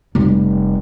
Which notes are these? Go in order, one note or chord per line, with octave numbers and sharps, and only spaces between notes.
F1 G3